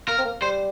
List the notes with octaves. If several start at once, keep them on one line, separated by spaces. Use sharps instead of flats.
A#3 A#4
C4
A#3
G3 C5